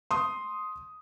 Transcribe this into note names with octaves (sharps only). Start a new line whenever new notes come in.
C6 D#6